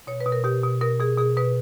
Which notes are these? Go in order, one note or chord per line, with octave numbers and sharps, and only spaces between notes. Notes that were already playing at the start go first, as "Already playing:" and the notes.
B2 C#5
B4
B2
A#4
B2 G4
B2
B2 A#4
B2 G#4
B2 G#4
B2 B4